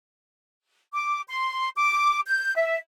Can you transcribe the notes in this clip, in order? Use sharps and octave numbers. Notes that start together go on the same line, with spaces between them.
D6
C6
D6
G6
E5